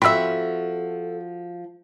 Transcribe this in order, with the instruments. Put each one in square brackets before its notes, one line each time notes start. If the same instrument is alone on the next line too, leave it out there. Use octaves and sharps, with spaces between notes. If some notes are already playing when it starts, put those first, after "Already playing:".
[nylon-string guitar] F3 F#4 [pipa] C4 E5 [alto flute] A4 [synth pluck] B5 E6